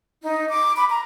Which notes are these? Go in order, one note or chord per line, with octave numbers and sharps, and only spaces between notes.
D#4
D6
B5
A#5